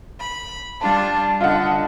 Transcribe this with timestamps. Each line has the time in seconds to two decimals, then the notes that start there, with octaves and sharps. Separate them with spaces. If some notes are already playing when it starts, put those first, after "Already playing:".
0.20 B5
0.81 G3 D4 F4 A5
1.41 D3 F4 D#5 F#5